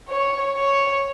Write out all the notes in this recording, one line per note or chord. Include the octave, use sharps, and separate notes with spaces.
C#5
C#5